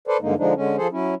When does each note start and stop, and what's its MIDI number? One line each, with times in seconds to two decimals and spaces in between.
0.08 0.17 69
0.08 0.17 71
0.08 0.17 72
0.08 0.17 74
0.21 0.35 43
0.21 0.35 50
0.21 0.35 56
0.21 0.35 58
0.21 0.35 63
0.38 0.54 50
0.38 0.54 53
0.38 0.54 56
0.38 0.54 62
0.38 0.54 63
0.56 0.76 50
0.56 0.76 56
0.56 0.76 61
0.77 0.88 53
0.77 0.88 68
0.77 0.88 69
0.77 0.88 72
0.92 1.15 54
0.92 1.15 61
0.92 1.15 64